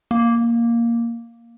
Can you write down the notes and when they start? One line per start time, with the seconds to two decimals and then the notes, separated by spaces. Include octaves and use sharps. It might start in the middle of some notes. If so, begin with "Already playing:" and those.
0.11 A#3